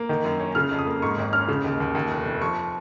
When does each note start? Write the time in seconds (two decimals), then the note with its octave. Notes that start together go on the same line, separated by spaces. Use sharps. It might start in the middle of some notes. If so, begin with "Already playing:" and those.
Already playing: A#3
0.09 D#3
0.25 F#2
0.39 C#4
0.55 C#3 F6
0.71 F2
0.79 D#6
0.87 A#3
1.02 G#2 C#6
1.17 G#1
1.33 C#4 F6
1.48 C#3
1.64 D#2
1.80 D#2
1.95 D#2
2.11 F1
2.25 F1
2.41 F3 C#6